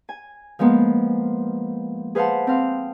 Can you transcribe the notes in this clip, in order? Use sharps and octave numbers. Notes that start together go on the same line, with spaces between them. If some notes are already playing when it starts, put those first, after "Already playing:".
G#5
F3 G#3 A#3 B3
G#4 B4 C5 F5 F#5 A5
C4 F5